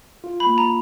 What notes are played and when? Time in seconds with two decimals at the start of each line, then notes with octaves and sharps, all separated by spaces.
0.24 F4
0.40 B5
0.47 A#3
0.58 A#5